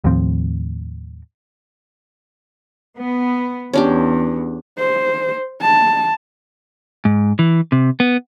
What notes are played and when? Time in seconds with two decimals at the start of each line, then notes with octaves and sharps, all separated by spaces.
0.04 D#2 A2 F3 C4
2.99 B3
3.73 E2 C#4 D4 G4
4.79 C5
5.61 A5
7.05 G#2
7.39 E3
7.72 C3
8.00 B3